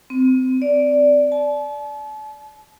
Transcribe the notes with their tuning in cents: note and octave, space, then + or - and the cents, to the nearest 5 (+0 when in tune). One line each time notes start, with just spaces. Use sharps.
C4 -20
D5 -10
A5 -40